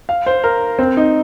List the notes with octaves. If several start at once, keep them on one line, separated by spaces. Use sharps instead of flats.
F5
C5
A#4
C4
D#4